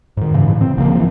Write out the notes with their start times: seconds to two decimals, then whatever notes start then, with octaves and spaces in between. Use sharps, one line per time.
0.17 G#2 D#3
0.33 G2 C#3 E3
0.47 A2 E3
0.61 C4
0.77 G#1 C#3 F3 A#3
0.95 E3 F3